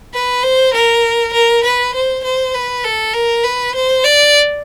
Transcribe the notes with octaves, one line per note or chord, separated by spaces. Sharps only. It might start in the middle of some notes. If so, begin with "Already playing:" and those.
B4
C5
A#4
A#4
B4
C5
C5
B4
A4
A#4
B4
C5
D5